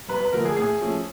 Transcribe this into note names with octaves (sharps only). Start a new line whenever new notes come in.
G2 B4
B4
D3 F3 A3 A#4
G#4
A2 G#4
F3 A3 C#4